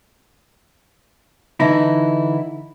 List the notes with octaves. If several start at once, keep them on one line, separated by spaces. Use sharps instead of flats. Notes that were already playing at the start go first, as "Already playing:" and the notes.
D3 E3 D#4 E4